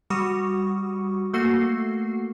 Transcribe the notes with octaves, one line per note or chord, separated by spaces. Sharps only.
G3 F#4 C#6 D#6
A3 A#3 F#4 C7